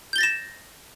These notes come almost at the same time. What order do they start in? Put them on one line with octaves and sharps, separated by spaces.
G6 G7 A6 A#6 E7